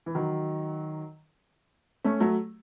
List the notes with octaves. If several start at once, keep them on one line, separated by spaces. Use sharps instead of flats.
E3
D#3 F#3
A3 C#4
F#3 A3